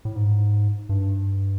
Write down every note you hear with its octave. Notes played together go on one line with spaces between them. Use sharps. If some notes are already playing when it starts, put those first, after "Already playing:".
A2
G#2
G2